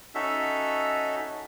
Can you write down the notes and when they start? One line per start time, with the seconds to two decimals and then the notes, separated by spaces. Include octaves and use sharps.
0.15 C#4 D#4 F#4 A4 E5